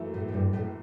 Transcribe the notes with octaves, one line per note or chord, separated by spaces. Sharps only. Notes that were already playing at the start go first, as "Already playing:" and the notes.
Already playing: F#2 E3 A3
A2
A2
G2
A2